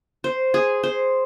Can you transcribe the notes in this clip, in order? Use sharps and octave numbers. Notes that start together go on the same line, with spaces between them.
C5
G#4
C5